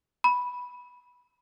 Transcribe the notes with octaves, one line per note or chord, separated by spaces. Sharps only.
B5